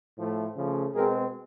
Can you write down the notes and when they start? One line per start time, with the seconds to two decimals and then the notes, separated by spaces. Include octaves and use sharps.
0.17 A2 F3 A3
0.56 C#3 F3 A3
0.95 B2 G#3 C4 G#4 A#4